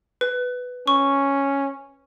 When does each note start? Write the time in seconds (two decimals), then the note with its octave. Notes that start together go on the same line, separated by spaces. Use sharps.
0.21 B4
0.88 C#4 C#6